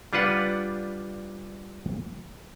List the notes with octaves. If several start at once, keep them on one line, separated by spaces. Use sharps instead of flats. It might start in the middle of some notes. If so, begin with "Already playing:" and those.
G3 D4 F4 B4 F#5